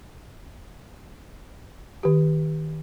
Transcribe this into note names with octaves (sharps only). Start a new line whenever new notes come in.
D#3 G4